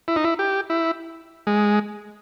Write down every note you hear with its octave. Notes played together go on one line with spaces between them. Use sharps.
E4
D#4
E4
G4
E4
G#3